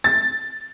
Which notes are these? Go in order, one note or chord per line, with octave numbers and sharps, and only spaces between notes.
A6